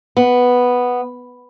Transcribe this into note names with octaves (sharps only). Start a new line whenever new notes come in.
B3